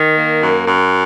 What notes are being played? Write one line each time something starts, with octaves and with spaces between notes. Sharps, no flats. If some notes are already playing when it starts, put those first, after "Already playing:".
Already playing: D#3
A#3
F#2
F#2